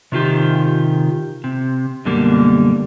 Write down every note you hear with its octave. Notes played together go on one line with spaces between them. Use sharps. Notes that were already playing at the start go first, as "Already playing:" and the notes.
C3 D#3 F4 G4
C3
F#2 B2 D3 G3 A#3